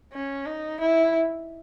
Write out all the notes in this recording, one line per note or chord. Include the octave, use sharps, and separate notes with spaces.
C#4
D#4
E4